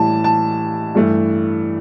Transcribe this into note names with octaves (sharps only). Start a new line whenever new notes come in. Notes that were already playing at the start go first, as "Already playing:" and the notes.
Already playing: A2 E3 G3 A5
A5
G2 E3 A3